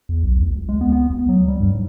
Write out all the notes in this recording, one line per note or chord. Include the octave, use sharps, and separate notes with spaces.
E2
B1
D2
C#2
G#3
B3
B3
D2
F#3
G3
G2
G#2